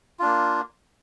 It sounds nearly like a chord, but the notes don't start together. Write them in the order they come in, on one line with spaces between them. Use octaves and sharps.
F4 D4 A#3